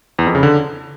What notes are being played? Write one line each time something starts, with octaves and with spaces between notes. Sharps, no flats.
E2
F2
C#3
D3